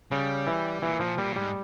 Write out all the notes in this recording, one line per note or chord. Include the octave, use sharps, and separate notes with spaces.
C#3 G3
E3
A#2 E3
A#2 F3
A#2 G3
G#2 G3